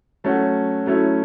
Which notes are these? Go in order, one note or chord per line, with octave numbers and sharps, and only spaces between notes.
F#3 A3 C#4 F#4
F#3 A3 C#4 E4